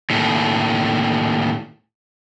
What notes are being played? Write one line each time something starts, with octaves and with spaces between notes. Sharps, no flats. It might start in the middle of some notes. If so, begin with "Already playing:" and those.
D#2 A2